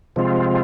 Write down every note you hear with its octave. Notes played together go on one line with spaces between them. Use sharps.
C3 F3 G#3 C4 F4